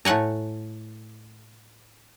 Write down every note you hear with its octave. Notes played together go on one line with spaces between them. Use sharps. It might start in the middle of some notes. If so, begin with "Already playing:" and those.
A2 A3 F#5 G#5 A#5